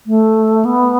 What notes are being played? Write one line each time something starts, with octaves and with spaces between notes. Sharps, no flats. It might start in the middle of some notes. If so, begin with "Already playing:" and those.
A3
B3